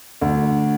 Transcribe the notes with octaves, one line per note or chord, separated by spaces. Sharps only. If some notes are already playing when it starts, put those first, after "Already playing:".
D2